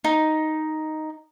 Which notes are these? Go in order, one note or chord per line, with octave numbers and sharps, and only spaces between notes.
D#4